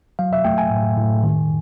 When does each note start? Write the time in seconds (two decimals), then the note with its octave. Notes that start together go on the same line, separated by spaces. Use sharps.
0.19 F#3 F5
0.33 E5
0.45 A3 G5
0.58 G#5
0.71 A2
0.97 A2
1.23 D#3